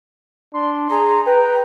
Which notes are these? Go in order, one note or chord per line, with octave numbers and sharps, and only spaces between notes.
D4 C6
G#4 A#5
B4 G5 A#5